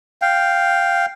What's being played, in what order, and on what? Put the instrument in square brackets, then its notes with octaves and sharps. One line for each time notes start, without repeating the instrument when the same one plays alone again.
[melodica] F5 G5